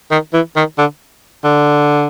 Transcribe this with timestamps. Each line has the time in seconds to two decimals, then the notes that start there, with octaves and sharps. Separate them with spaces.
0.11 D#3
0.34 E3
0.56 D#3
0.78 D3
1.44 D3